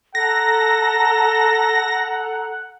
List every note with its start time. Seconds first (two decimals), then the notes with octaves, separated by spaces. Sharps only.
0.15 A4 F#5 A#5 A#6